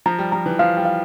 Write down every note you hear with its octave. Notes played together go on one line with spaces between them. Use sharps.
F3 A#5
G3
F3 A#5
E3
F3 F5
G3
F5